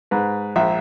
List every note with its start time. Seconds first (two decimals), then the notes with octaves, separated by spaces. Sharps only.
0.11 G#2 B4
0.56 A#1 E5